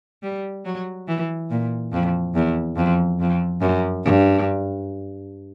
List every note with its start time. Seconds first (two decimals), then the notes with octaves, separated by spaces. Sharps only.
0.23 G3
0.65 F#3
1.08 E3
1.50 A#2
1.93 F2
2.35 E2
2.77 F2
3.20 F2
3.61 F#2
4.04 G2